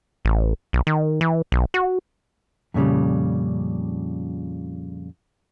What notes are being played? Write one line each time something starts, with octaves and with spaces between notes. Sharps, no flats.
A1
B1
D#3
E3
B1
F#4
F2 A#2 C#3 G3